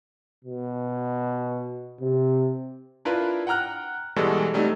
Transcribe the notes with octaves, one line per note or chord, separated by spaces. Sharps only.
B2
C3
D4 E4 F4 A#4 B4
F#5 G5 A#5 F6 F#6
B2 E3 G3 G#3 F#4 A4
F#3 G3 A3 C4 D#4